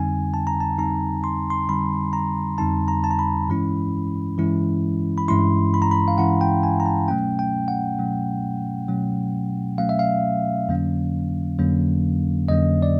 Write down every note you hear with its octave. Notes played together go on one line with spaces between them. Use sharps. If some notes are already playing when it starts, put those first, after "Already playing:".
Already playing: F2 D3 G3 C4 D#4 G#5
A5
A#5
A5
F2 D3 G3 C4 D#4 A#5
C6
C6
F2 D3 G3 C4 D#4 B5
A#5
F2 D3 G3 C4 D#4 A5
A#5
A5
A#5
B5
G2 E3 G#3 C#4 E4
G2 E3 G#3 C#4 E4
B5
G2 E3 G#3 C#4 E4 C6
B5
A#5
B5
F5
G2 E3 G#3 C#4 E4 F#5
G5
G#5
A#5
A5
B2 F#3 A3 C#4 G5
G5
F#5
B2 F#3 A3 C#4
B2 F#3 A3 C#4
B2 F#3 A3 C#4 F5
E5
F5
F2 D3 F#3 A#3 C#4
F2 D3 F#3 A#3 C#4
F2 D3 F#3 A#3 C#4 D#5
D5